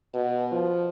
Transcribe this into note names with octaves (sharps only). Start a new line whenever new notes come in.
B2
F3